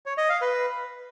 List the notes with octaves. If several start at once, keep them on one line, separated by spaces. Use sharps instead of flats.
C#5
D#5
F5
B4